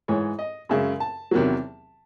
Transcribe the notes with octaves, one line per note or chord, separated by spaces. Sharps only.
G#2 E3 G#3 C#5
D#5
F#2 C#3 G#3 E5
A5
E2 C3 D#3 F#3